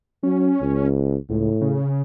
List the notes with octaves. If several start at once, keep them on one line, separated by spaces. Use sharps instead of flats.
F#3 C#4
C#2
C#2 A2
C#3